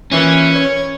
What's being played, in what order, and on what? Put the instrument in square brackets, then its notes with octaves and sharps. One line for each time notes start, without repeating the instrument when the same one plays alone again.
[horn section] A#2 E3 [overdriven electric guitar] C#4
[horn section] C#5